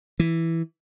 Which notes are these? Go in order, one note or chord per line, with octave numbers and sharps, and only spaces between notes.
E3